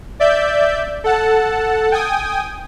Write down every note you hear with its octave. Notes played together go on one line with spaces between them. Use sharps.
D5 E5 G6
A4 F#5 A5
G5 G#5 D#6